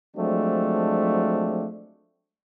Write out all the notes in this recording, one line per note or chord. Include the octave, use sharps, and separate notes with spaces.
F3 F#3 G#3 A3 C4 D4